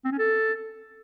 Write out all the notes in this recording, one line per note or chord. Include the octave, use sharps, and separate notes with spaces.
C4
C#4
A4